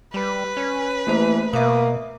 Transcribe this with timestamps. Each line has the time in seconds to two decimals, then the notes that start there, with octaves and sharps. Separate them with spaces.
0.14 G3 B4
0.57 C#4
1.07 E3 A3 A#3 C5
1.53 B2 A#3 E5 D#6